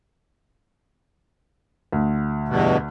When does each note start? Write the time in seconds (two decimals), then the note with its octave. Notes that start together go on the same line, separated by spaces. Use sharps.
1.92 D2
2.48 E2 G2 B2